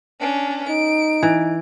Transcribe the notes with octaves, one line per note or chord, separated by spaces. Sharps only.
C#4 D4
D#4 D7
E3